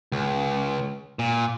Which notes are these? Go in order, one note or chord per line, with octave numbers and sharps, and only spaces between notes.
C#2
A#2